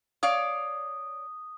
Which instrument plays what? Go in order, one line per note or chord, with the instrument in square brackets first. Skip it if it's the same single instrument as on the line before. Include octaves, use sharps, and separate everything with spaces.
[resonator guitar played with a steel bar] C#5 D5 F5 [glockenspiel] D#6